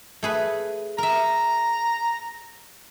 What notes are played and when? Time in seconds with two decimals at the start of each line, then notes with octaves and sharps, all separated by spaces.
0.23 A3 G#4 B4
0.98 A#4 E5 A#5